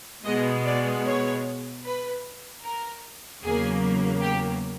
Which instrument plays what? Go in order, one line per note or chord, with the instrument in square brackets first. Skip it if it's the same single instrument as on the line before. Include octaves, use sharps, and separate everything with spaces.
[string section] B2 G#3 B3 D#5
D5
C#5
B4
A#4
E2 C#3 F#3 A#3 G#4
G4